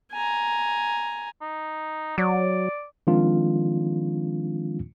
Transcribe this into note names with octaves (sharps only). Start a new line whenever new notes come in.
G#5 A#5
D#4
F#3 D5
D#3 F3 G#3 C4 D4 F4